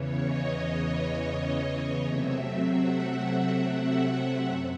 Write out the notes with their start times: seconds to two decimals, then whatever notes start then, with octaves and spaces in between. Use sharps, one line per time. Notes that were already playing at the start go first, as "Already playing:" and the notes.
Already playing: E2 C#3 E3 C#5
0.23 D#5
1.45 C#5
1.75 D#5
2.05 C3 F#3 A3 C4 E5
2.66 F#5
3.87 F#5
4.17 F#5
4.47 F#2